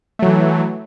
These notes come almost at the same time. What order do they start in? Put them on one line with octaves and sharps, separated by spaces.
A3 F#3 E3